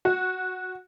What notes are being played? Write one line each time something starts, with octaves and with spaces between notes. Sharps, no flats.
F#4